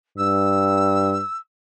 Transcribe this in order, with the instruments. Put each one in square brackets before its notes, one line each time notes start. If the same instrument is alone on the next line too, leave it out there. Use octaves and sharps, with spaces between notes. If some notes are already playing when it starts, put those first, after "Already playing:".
[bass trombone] G2 [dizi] E6